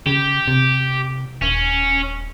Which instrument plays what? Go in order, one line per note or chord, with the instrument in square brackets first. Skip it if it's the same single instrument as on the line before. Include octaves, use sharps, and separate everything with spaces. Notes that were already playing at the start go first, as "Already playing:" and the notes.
[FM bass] C#3 [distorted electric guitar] G4
[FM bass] C3
[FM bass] D#1 [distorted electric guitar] C#4